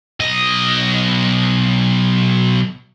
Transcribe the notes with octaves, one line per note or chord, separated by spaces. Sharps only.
B1 D#5